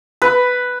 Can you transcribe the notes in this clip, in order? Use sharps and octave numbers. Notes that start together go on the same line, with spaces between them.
B4